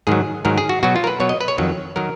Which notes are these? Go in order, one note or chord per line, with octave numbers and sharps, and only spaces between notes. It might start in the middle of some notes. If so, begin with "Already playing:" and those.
G#2 D#3 F#3 G#4
G#2 D#3 F#3 A#4
G#4
F#4
B2 F#3 F#4
F4
A#4
B4
B2 F#3 C#5
D#5
B4
C#5
F2 D#3 F#3
D#3 F#3 A#4